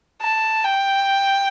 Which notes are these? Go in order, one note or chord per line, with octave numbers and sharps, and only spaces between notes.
A5
G5